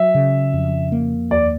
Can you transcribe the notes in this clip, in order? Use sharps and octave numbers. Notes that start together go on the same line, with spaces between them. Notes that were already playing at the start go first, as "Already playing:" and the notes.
Already playing: F#3 E5
C#3
F2
A#3
D#2 D5